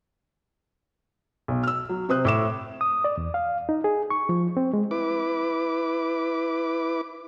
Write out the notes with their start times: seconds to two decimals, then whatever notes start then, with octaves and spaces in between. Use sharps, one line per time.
1.48 B1
1.63 E6 F6
1.89 F#3
2.09 C3 C5 D#6 F#6
2.25 A2 D6 E7
2.81 D#6
3.04 D5
3.17 E2
3.34 F5
3.69 D#4
3.84 G#4
4.10 C#6
4.29 F3
4.57 C4
4.73 G#3
4.91 E4 B4 D6